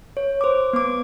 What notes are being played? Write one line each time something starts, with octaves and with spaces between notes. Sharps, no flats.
C#5
C5 D6
B3 D6